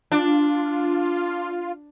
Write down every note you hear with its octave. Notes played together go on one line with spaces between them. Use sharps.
D4 F4